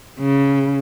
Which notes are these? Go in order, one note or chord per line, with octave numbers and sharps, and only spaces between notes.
C#3